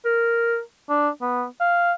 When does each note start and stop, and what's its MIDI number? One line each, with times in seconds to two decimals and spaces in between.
0.05 0.60 70
0.89 1.09 62
1.21 1.45 59
1.60 1.93 77